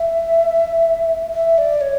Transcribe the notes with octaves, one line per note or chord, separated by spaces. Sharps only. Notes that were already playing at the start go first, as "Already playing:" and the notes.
Already playing: E5
E5
D5
C#5